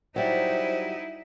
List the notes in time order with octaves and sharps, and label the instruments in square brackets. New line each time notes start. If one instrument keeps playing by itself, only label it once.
[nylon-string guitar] F#3 G3 [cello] D#4 E4 [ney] C5